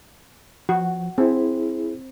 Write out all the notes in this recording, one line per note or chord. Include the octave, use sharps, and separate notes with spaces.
F3 F#4
C4 E4 G#4